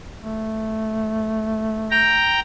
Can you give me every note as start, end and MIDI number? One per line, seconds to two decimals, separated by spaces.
0.23 2.32 57
1.91 2.40 79
1.91 2.40 82